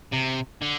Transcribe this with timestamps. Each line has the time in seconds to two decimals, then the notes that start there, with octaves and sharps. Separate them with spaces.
0.12 C3
0.62 D3